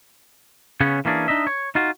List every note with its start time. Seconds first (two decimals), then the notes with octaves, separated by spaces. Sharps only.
0.81 C#3 B3 C#4 C#5
1.05 E3 A#3 C#4 D4 G#4
1.28 D4 D#4 D#5 E5
1.47 C#5
1.75 D#4 F4 F#4